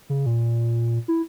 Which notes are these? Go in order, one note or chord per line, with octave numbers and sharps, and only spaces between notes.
C#3
A#2
E4